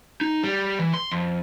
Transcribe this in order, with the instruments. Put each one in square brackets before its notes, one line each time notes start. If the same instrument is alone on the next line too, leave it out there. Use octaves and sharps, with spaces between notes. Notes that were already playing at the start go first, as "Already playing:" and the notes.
[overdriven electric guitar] D#4
G3
E3
C6
F2